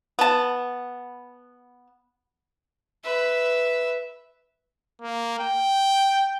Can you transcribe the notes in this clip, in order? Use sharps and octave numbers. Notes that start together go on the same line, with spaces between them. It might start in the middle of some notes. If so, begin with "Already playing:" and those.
B3 A5
B4 E5
A#3
G5